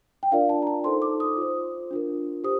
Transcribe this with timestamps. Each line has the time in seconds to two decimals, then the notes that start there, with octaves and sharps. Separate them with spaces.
0.23 G5
0.32 D4 F4 A#4 D5 F5
0.49 A5
0.62 A#5
0.67 A5
0.84 D#4 A4 C5 C6
1.02 D6
1.20 D#6
1.37 F4 C5
1.91 D4 F4 A#4
2.44 G4 C5 D#6